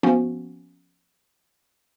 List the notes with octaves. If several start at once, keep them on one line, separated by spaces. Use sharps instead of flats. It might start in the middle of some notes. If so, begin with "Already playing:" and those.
F3 A#3 B3 C#4 F#4